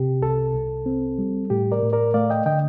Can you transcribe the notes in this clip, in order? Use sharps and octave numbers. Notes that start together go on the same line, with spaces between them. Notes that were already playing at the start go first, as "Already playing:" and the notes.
Already playing: C3 G4
C2 A4
C2
C4
G3
A2 G4
A#4 D5
A2
A#4 D5
A3 D5 F5
D#5 G5
D3 D#5 G5